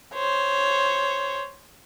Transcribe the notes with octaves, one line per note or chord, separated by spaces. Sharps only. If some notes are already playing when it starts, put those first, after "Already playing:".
C5 C#5